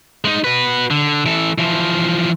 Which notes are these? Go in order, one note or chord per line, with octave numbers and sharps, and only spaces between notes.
G#3 D#4
F#4 B4
D3
E3 A4
E3 F3